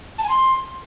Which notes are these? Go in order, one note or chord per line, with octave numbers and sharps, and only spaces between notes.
A5
G#5
C6